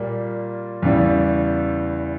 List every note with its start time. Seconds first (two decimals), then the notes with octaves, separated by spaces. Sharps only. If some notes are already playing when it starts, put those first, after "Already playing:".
Already playing: A#2 G3 A#3
0.82 E2 C#3 E3 G3